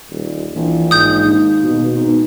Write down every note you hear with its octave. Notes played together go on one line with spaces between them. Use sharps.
D#1
A#1 E3
G#2 D#6 G6
D#2
B2
G#2 B3